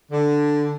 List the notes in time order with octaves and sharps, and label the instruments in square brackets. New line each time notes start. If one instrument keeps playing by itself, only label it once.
[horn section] D3